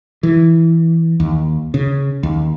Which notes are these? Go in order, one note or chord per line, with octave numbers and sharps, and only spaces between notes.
E3
D#2
C#3
D#2